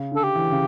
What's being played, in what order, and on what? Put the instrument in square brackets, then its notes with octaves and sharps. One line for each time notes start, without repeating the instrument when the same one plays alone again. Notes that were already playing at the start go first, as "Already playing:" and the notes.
Already playing: [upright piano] C#3
[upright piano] D3 [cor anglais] A4
[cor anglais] G4
[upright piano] E3
C#3